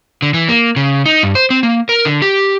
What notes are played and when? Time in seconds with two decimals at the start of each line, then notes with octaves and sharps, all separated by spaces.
0.22 D3
0.34 E3
0.49 A#3
0.76 C#3
1.06 D#4
1.23 G2
1.35 C5
1.50 C4
1.63 A#3
1.89 A#4
2.05 D3
2.22 G4